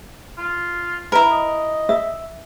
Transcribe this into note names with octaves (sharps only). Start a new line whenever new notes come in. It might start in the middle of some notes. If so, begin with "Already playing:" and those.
F4
E4 A#4 B4
D#5
E5